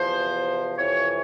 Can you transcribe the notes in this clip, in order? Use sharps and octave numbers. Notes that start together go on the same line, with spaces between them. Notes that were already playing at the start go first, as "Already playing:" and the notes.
Already playing: E2 C3 F3 C5
F2 C3 E3 C#5